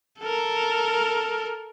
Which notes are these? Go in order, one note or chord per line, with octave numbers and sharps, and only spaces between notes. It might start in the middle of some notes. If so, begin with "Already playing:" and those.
A4 A#4